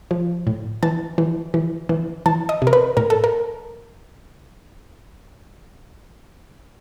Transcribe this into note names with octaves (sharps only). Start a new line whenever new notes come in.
F3
A2
E3 A5
E3
E3
E3
E3 A5
D#5
C3
A#4
B4
A2 A#4
A4
A#4